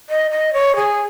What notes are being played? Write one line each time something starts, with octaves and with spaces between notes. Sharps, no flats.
D#5
D#5
C#5
G#4